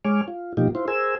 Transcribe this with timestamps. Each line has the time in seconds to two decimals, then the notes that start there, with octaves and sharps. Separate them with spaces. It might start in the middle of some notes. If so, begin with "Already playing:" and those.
0.05 G#3 C#5 G#5 D6 F6
0.28 F4
0.57 B2 F3 A#3 D#4 F4 G4
0.75 E4 F4 C5
0.88 G#4 A#4 C5 G#5 E6